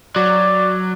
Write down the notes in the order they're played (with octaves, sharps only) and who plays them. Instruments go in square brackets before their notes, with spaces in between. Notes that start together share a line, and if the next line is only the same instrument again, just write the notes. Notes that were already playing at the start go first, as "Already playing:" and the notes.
[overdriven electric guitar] F#3 [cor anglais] D5